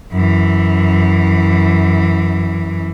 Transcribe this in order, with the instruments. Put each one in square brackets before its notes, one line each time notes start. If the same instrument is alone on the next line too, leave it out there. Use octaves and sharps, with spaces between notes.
[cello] F#2 E3